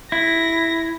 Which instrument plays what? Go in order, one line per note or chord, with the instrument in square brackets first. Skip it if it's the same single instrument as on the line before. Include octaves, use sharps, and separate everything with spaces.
[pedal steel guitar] E4 [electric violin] A#6